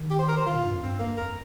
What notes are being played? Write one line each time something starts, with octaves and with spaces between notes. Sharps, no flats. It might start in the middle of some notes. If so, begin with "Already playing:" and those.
Already playing: D#3
G4
C5
A#4
C5
D#3 F4
A#2
G2
F2
G2 C4
A#3
F2 A#4